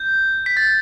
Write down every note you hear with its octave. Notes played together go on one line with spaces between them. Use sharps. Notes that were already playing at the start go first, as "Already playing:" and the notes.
Already playing: G6
B6
A6